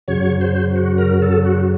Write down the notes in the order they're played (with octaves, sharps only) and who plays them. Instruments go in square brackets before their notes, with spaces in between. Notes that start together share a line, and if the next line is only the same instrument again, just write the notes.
[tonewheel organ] F#2 C#3 F#3 C#5
C5
F#4
A#4
A4
F#4